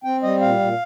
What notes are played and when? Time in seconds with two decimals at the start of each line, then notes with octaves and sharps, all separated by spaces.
0.04 C4 G5
0.23 G3 D#5
0.41 A#2 F5
0.60 A#2